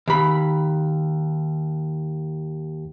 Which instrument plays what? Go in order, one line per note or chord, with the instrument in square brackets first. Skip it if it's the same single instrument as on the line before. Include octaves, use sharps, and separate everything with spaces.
[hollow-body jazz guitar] D#2 B5